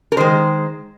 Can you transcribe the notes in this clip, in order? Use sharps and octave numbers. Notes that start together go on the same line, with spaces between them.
A#4
D#3 G#3 C5